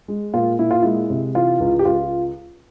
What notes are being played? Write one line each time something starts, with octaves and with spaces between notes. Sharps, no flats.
G#3
A#2 F4
A#2 E4
F4
G#3 E4
C3
E3 F4
C#2
G4
C#2 F4